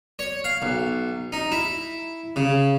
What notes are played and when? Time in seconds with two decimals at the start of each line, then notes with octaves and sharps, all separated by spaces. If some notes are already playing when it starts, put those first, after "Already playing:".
0.19 C#5
0.44 F5
0.62 B1
1.32 D#4
1.52 E4
2.36 C#3